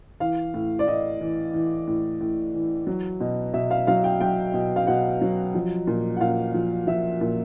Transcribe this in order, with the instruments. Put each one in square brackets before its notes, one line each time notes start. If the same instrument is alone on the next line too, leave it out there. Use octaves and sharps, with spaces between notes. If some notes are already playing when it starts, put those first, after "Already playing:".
[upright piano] E3 F5
A2
D5
A2 D#5
E3
E3
A2
A2
E3
F#3
B2
B2 E5
F5
F#3 F5
G5
F#3 G5
B2
F5
B2 F#5
F#3
F3
A#2
F#5
A#2 F5
F3
F3 E5
A#2